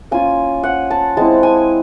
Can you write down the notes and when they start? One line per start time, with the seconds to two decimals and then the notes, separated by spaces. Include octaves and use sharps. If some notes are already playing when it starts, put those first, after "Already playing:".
0.11 A#3 C#4 F4 G#5
0.63 F#5
0.91 A5
1.17 G#3 C4 E4 A5
1.43 G#5